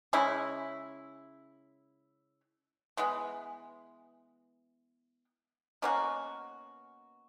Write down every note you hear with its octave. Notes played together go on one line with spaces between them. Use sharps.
C#3 G#3 C#4 E4
E3 G#3 B3
B2 A#3 C#4 F#4